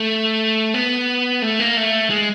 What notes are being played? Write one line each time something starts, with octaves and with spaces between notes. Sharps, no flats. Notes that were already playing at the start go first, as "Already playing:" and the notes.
Already playing: A3
B3
A3
A#3
A3
G#3